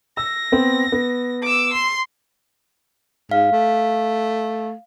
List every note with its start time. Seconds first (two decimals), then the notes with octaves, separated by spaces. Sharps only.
0.17 E6 A#6
0.52 B3 C4
0.92 B3
1.43 D6 E6
1.73 C6
3.31 G#2 F5
3.52 A3